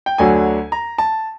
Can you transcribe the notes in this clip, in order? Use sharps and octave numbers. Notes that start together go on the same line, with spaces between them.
G5
D2 D3 F#3 G#5
A#5
A5